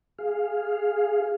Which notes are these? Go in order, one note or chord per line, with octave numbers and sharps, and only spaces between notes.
G#4 F5